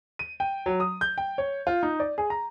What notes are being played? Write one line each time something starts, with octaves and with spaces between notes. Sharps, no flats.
D#7
G5
F#3
D#6
G6
G5
C#5
F4
D#4
D5
G#4
A#5